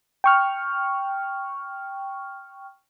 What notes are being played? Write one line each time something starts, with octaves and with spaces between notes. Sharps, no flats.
G5 C#6 F6